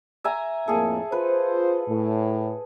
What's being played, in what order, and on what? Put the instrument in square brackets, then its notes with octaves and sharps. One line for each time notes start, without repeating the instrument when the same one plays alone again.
[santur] E5 G#5 A#5
[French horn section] F2 A2 A#3 [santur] G#4 A4
[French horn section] F4 C5 [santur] B4
[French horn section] A2